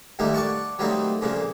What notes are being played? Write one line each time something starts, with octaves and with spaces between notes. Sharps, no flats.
D#2 A#2 G3 A3 A#3 D#4
D5 F#5 A5 C#6
F#3 G3 A3 A#3 C4 D#4
F2 A#2 C#3 A#3